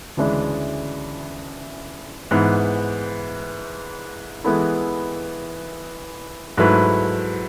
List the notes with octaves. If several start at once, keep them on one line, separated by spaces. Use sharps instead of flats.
D2 C#3 E3 G#3 D4
G#2 E3 B3
E3 G#3 B3 E4 A4
G#2 F#3 A3 E4 B4